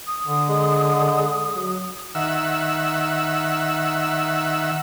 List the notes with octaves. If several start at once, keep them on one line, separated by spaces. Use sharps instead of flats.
D#6
D3
G#3
F#3
D#3 E5 F#5 E6